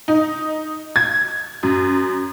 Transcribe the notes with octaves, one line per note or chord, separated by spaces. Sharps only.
D#4
G#6
F#2